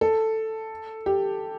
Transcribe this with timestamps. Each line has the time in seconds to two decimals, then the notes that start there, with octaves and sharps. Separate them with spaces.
0.01 A4
1.06 G4